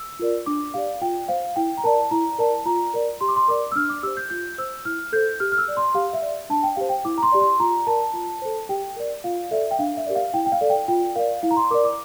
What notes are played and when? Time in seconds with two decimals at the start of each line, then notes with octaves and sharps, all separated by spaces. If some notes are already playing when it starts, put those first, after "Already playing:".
Already playing: E6
0.20 F4 A#4 D5
0.46 D4 D6
0.74 G4 D5 F5
1.01 F4 G5
1.28 C5 F5
1.56 E4 G5
1.78 A#5
1.84 A#4 D5 A5
2.11 E4 A#5
2.38 A#4 D5 A5
2.66 F4 A#5
2.94 A#4 D5
3.21 G4 C6
3.28 D6
3.36 C6
3.48 A#4 D5 D6
3.72 E6
3.76 D4 F6
3.89 D6
4.03 G4 C5 E6
4.17 G6
4.30 F4 G6
4.58 C5 E6
4.85 E4 F6
5.13 A4 C5 G6
5.40 G4 F6
5.52 F6
5.58 E6
5.68 D5
5.77 C6
5.94 G4 F5
6.13 E5
6.22 D5
6.50 D4 A5
6.63 G5
6.76 G4 C5 F5
6.89 G5
7.05 E4 D6
7.18 A#5
7.23 C6
7.32 G4 D5
7.41 C6
7.60 F4 A#5
7.87 A#4 D5 A5
8.14 F4
8.42 A4 C5
8.69 G4 G5
8.96 A#4 D5
9.24 F4 F5
9.51 A4 D5 E5
9.71 G5
9.79 D4 F5
9.97 E5
10.06 G4 A#4 D5
10.15 F5
10.34 E4 G5
10.46 G5
10.52 F5
10.61 A4 D5
10.70 G5
10.88 F4 G5
11.15 A#4 D5 F5
11.43 E4 F5
11.51 A#5
11.57 C6
11.71 A#4 D5 D6
11.85 D6